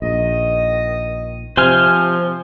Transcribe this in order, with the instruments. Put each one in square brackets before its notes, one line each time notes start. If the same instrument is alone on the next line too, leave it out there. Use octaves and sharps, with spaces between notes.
[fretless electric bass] A#1 [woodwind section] D#3 D#5
[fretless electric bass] C3 [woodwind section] F3 [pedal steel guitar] C5 G#5 F6